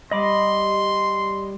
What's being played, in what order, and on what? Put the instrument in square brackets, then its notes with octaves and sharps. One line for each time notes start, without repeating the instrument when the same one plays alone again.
[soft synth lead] G3 [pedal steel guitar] D#5 B5 D6 [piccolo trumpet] C6